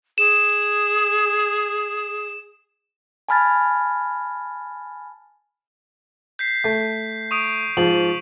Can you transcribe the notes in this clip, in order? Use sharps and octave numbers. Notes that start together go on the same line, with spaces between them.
G#4 E7
G#5 A5 B5 F6 G#6 A6
G6 B6 C7
A3
C#6 D#6 D7
G#2 F3 F#7